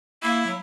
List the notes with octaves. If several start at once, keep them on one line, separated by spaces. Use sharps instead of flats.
A#3 E4
F#3